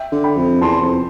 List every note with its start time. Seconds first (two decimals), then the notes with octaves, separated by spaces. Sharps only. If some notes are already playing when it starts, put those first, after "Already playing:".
Already playing: E5 G5
0.12 D3
0.24 G5 B5
0.36 F2
0.61 E2 A5 C6
0.81 F2